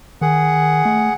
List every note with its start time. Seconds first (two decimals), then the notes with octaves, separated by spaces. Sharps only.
0.21 D#3 G#4 F#5
0.85 A3